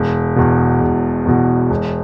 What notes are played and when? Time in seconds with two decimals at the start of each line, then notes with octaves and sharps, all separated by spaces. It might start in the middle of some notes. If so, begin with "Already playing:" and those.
Already playing: E1
0.36 E2 B2
0.81 E1
1.26 E2 B2
1.70 E1